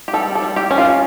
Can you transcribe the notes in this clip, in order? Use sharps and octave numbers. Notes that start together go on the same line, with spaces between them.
G4
G3 A4
A4
G3
G4
C#4
F4